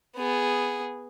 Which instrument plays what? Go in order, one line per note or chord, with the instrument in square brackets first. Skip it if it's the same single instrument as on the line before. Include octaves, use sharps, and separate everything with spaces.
[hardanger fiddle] B3 G#4